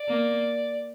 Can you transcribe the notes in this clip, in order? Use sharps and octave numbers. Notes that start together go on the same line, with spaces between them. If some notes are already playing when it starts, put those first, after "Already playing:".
Already playing: D5
A#3